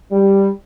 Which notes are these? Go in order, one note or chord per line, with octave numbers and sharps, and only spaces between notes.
G3